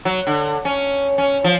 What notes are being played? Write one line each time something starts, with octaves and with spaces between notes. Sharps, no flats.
F#3
D3
C#4
C#4
F3